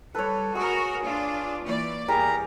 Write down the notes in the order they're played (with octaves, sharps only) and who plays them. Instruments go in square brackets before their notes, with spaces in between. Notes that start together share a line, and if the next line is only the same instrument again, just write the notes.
[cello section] G3 [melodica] A4 [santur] B4 C#5
[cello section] F#4 A#4 [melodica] G#4 [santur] C#6
[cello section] D4 F4
E3 A#3 D5
[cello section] E2 [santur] G3 G#4 [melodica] A#4 A#5